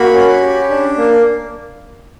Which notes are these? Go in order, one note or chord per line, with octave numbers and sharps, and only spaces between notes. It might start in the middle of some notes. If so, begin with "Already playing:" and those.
Already playing: A#3 F#4 B5
C#4
G4
D4
A#3